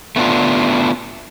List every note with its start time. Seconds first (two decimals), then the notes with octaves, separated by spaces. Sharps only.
0.16 A3 B3 D4 F4